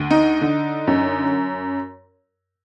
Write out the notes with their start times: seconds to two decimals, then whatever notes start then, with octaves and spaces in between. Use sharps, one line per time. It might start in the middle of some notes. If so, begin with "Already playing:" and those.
Already playing: D2
0.10 D#4
0.41 D3
0.87 F#2